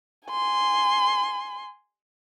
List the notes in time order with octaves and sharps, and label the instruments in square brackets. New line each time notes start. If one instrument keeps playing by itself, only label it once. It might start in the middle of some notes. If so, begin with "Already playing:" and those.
[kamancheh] G#5 C6